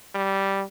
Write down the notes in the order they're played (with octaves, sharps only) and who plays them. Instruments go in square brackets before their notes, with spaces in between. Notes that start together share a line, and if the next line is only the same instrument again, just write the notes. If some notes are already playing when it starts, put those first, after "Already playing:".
[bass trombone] G3